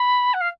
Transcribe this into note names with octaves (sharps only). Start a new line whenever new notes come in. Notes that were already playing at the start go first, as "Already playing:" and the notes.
Already playing: B5
F#5
F5